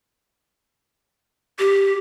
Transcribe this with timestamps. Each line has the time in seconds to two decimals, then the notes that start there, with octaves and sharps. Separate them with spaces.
1.59 G4